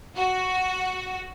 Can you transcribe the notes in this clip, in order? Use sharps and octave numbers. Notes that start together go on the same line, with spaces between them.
F#4